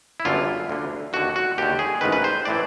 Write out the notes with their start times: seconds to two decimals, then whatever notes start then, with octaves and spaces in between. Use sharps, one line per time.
0.20 E4
0.25 G1 F#2 D3 F4
0.69 D2 D3
1.13 D#2 D3 F#4
1.36 F#4
1.58 D#2 D3 G4
1.79 G#4
2.01 A1 G#2 D#3 B4
2.12 B4
2.24 C5
2.45 A2 E3 D5